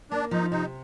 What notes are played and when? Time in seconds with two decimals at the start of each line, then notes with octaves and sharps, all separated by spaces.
0.11 A#3 D4
0.31 F3 D#4
0.51 C3 D#4